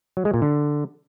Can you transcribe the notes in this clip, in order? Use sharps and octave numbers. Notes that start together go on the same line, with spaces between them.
F#3
G#3
A#2
D3